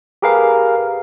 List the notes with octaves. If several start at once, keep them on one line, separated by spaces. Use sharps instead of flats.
G4 G#4 A#4 B4 F5